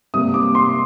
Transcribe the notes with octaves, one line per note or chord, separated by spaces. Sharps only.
C3 G3 A#3 D#6
D6
C6